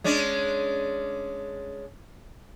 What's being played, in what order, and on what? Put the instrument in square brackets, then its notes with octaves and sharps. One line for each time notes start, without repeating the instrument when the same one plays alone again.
[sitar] G#3 C#4 D4